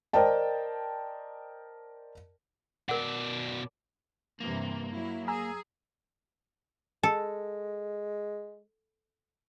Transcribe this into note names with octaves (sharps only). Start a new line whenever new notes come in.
A#4 C5 D5 D#5 G5 A5
B2 A#4 D5 F#5
G2 C3 E3 A#3
F#3 E4
G#4 G#5 A#5 E6
G#3 A4